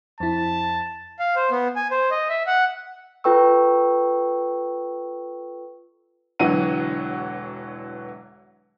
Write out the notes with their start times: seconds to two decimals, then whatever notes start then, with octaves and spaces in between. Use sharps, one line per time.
0.20 F2 E4 A5
1.19 F5
1.36 C5
1.51 B3
1.76 G#5
1.91 C5
2.11 D#5
2.30 E5
2.47 F#5
3.24 F4 A4 B4 G5 C#6 E6
6.39 E1 D3 E3 F#3 F#5 D#7